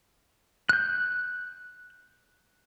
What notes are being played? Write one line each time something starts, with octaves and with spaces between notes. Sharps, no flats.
F#6 G6